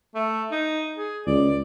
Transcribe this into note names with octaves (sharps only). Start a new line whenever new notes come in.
A3
D#4
G#4
C#2 D5